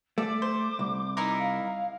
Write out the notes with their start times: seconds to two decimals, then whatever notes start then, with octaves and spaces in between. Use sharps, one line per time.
0.18 A3 D5 D6
0.42 C5
0.79 C2
1.17 D#4 E4 A#4
1.39 F5